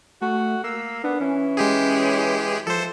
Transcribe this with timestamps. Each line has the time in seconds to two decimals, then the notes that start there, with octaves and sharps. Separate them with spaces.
0.22 A3 F#4
0.64 A#3 E6
1.04 B3 D4
1.20 E3 C#4
1.57 G#3 G4 G#4
2.67 F3 A4 C5